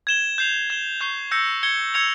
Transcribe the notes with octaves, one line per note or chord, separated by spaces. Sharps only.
G#6 E7 G7
G6 C7 F7
G#6 E7 G7
C#6 G6 C7 G7
E6 G6 A#6 C#7
G#6 C#7 G7
E6 G#6 C#7 F7